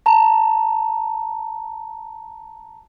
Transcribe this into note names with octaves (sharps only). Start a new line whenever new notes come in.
A5 A#5